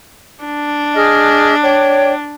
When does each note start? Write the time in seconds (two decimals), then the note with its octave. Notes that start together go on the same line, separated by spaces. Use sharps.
0.44 D4
0.95 G#4 D#5 F6
1.64 C#5 D5 G5